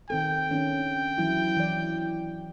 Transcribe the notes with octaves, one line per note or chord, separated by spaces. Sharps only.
D#3 C4 A4 G5
D#3 C#4 D4
E3 F#3 E4
E3 D5